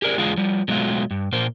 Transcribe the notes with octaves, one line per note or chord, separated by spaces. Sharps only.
G4 G#4 A#4 D5
E2 G#3 D4 F4 G#4 F5
F3 G3
B2 F#3 G#3 A3 E4 F4
G2
A#2 A#3 C5